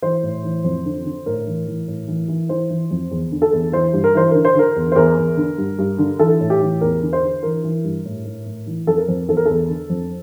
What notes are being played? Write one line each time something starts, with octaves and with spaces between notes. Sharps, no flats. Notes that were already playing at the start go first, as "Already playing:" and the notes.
E3 C5
A2
E3
F2
D3
D3
A2 A#4
E3
E3
A2
E3
E3
E3 C5
E3
F2
E2
D3
A4
E2
E3 C5
G2
A#4
E3 C5
D3 A#4
C5
D3 A#4
E2
C5
E2 A#4
E2
D3
G2
G2
D3
E3 A4
A2
G4
E3
E2 A#4
D3
C5
D3
E3 A#4
E3
G2
A2
A2
A2
E3
F2 A4
A#4
F2
E2 A4
A#4
E2 A4
D3
F2